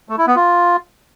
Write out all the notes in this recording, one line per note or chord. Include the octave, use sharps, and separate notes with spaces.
A3
E4
B3
F4